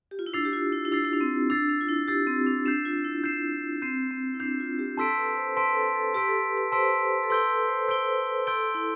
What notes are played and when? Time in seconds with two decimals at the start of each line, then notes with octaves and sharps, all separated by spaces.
0.11 G4
0.19 F4
0.26 E4
0.33 D4 E6 A6 C7
0.45 G4
0.53 F4
0.72 E4
0.85 E4
0.92 D4 E6 A6 C7
1.05 E4
1.13 D4
1.21 C4
1.50 D4 E6 A6 C7
1.69 D4
1.81 F4
1.89 E4
2.08 G4 E6 A6 C7
2.27 C4
2.47 D4
2.66 D4 G6 C7 E7
2.85 F4
3.04 E4
3.24 G6 C7 E7
3.82 C4 G6 C7 E7
4.11 C4
4.34 E4
4.40 D4 G6 C7 E7
4.60 F4
4.79 G4
4.97 A4 A5 C6 E6 B6 D7
5.18 B4
5.37 C5
5.56 B4 A5 C6 E6 B6 D7
5.69 B4
5.75 A4
5.95 A4
6.14 G4 A5 C6 E6 B6 D7
6.28 A4
6.43 B4
6.58 B4
6.72 C5 A5 C6 E6 B6 D7
7.23 A4
7.30 B4 C6 E6 G6 D7 G7
7.49 B4
7.68 C5
7.88 C5 C6 E6 G6 D7 G7
8.08 B4
8.27 B4
8.46 A4 C6 E6 G6 D7 G7
8.74 E4